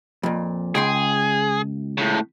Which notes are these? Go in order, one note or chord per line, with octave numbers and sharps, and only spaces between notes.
F2 A#2
C#2 G#4 G5 C6
A2 C#3